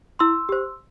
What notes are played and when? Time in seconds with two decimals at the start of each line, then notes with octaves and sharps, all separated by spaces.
0.19 E4 C6 E6
0.49 G4 C5